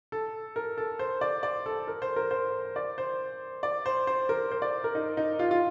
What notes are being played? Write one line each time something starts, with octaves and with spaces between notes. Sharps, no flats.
A4
A#4
A4
C5
D5
D5
A4
A#4
C5
A#4
C5
D5
C5
D5
C5
C5
A#4
C5
D5
A#4
D#4
D#4
F4
F4